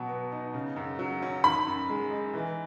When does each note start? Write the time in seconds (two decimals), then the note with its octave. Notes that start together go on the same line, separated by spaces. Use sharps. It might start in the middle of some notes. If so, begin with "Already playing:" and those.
Already playing: B2 F#3
0.09 B3
0.32 D#4
0.54 C#3
0.76 F#2
0.99 F#3
1.22 C#4
1.44 D#3 B5
1.67 F#2
1.90 G#3
2.11 D#4
2.33 E3